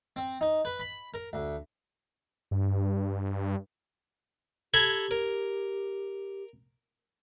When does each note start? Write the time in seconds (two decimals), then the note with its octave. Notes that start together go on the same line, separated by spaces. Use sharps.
0.16 C4
0.41 D#4
0.65 B4
0.80 B5
1.14 A#4
1.33 D2
2.51 G2
4.74 G4 A4 A#5 B5 G#6
5.11 A#4